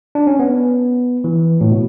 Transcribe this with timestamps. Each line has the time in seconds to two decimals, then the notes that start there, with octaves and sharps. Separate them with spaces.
0.15 D4
0.27 C#4
0.39 B3
1.24 E3
1.61 A2
1.71 B2